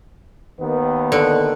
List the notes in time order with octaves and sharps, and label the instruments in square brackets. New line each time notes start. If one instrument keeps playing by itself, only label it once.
[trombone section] D#2 D#3 B3
[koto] D3